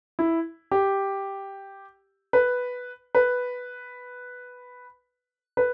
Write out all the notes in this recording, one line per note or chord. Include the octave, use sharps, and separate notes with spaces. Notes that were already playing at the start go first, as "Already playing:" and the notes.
E4
G4
B4
B4
B4